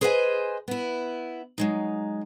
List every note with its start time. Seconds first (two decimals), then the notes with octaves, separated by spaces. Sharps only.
0.01 G#4 B4 C5 D#5 E5 G#5
0.68 B3 E4
1.58 F#3 G#3 D#4